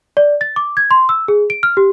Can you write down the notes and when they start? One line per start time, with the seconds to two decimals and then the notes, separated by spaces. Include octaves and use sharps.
0.17 D5
0.41 A6
0.56 D6
0.77 G#6
0.91 C6
1.09 E6
1.28 G#4
1.50 D7
1.63 F6
1.77 G4